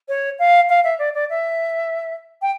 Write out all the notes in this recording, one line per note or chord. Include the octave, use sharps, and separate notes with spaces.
C#5
F5
F5
E5
D5
D5
E5
G5